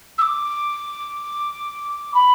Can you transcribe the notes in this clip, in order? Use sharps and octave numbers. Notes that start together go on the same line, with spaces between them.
E6
D6
B5